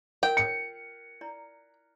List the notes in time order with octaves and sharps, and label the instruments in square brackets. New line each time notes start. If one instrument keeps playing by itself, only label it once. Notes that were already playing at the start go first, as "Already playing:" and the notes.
[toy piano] F4 A#4 [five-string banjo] G5
[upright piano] C#7
[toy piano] E4 D5 A#5